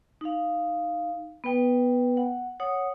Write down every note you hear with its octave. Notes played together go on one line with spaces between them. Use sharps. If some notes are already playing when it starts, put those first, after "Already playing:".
D#4 F5
B3 B4 G5
F#5
C#5 F#5 D#6